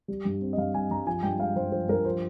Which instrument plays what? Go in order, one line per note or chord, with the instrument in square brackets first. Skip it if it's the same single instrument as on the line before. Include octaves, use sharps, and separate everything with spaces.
[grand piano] G3
G2
C4
D#5
G2 F5
G3 G#5
G2 A#5
F3 G#5
G2 G5
G#3 F5
G2 C5
F3 C5
G2 A#4
F3 C5